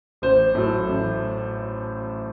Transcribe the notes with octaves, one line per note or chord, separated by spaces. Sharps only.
A1 C5
A2 F#3 A3
A1